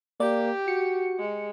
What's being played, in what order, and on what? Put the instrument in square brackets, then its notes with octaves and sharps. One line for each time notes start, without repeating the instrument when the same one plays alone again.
[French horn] A#3 [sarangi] G4 [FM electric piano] D5
[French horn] F#4 [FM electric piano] C#7
[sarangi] G#3